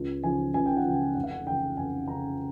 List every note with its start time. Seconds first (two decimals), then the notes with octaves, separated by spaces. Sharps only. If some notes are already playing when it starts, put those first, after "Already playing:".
Already playing: C#2
0.24 C#3 F3 G#5
0.54 C#2 G#5
0.66 G5
0.77 F#5
0.85 C#3 F3 G5
1.15 F1 F#5
1.24 F5
1.31 F#5
1.46 F2 C#3 G5
1.77 F1 G#5
2.08 F2 C#3 A#5